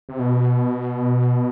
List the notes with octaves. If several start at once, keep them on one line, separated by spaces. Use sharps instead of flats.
C3
B2